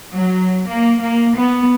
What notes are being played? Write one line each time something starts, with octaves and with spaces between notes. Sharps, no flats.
F#3
A#3
A#3
B3